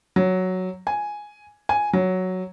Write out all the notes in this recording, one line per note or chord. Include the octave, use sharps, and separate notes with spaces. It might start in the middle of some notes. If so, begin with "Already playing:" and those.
F#3
G#5
G#5
F#3